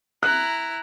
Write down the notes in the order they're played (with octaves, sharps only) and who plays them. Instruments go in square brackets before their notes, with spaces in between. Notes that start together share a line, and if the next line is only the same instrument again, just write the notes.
[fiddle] E4 A#5 [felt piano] F#6